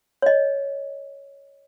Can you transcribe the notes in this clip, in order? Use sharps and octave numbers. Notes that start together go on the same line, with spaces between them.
C#5 D#5